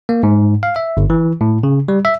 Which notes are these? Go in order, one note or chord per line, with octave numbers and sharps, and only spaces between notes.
A#3
G#2
F5
E5
G1
E3
A2
C#3
G3
E5